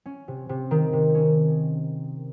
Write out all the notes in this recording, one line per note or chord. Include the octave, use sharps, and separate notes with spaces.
C#4
C3
C3
D#3
C3
C#4